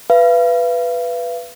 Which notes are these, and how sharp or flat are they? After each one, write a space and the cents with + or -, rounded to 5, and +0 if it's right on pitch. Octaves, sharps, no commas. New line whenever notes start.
B4 +0 F5 -40